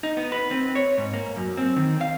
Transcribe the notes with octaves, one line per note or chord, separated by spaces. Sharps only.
D#4
B3
B4
C4
C#5
G#2
A#3
F#2
C4
D#3
F5